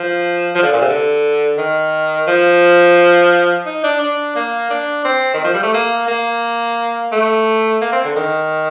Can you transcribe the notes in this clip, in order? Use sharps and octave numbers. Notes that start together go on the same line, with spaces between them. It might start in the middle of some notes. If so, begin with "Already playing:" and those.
Already playing: F3
F3
D3
A#2
C3
D3
D#3
F3
D#4
D4
D4
A#3
D4
C4
D#3
F3
G3
A3
A#3
A#3
A3
A#3
C4
D3
D#3